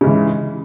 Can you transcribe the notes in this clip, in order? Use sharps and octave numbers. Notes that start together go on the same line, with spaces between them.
G#2 C#3 E3